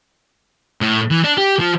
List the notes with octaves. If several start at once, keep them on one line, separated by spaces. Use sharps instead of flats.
A2
E3
D4
G4
F3